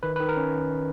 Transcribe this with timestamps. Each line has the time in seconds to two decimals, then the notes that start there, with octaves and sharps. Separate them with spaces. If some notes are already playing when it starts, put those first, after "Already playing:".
0.03 D#3 B4
0.16 B4
0.20 D#3
0.29 A#4
0.37 C#4